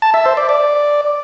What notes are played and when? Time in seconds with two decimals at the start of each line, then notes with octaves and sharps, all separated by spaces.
0.02 A5
0.14 E5
0.26 C5
0.37 D5
0.49 D5